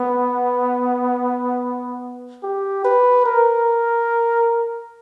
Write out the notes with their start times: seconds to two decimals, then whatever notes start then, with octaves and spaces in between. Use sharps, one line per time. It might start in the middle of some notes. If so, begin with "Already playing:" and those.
Already playing: B3
2.43 G4
2.84 B4
3.26 A#4